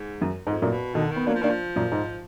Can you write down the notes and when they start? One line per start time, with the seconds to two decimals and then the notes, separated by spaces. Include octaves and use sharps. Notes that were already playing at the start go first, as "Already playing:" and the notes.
Already playing: G#2
0.21 F#2
0.45 F2 G#2
0.62 F#2 A#2
0.70 B2
0.94 B2 D3 D#3
1.11 D#3
1.16 B3
1.27 F#3 A#3 D4
1.34 F3
1.42 D#3 A#3 D4
1.50 F3
1.76 F#2 A#2
1.92 G#2